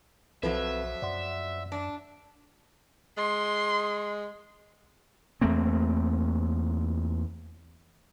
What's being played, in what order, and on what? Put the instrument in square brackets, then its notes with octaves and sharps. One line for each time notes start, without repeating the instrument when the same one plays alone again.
[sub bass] B1 [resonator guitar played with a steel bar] F2 F3 F#3 [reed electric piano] C4 A4 B4 [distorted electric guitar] E5
[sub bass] F#2 [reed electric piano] D5 F#5 C6
[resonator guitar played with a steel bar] D4
[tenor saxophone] G#3 [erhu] C6
[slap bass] E2 A3 A#3 C4